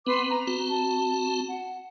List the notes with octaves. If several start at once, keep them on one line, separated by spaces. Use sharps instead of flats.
B3 C4 B4 C6 D6
B4 A#5
C4 F#4
A5
F#5